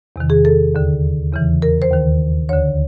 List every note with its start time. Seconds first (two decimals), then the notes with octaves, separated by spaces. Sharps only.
0.16 E2 C3 D#3
0.30 G#4
0.45 A4
0.75 D#2 D3
1.33 E2 C#3 E3
1.62 A#4
1.82 C5
1.91 D#2 D#3
2.49 D2 D3 C#5